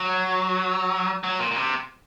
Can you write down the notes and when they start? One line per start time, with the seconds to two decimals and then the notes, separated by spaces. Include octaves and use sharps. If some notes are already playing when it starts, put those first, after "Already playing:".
Already playing: F#3
1.24 F#3
1.39 A#2
1.51 A#2
1.56 C3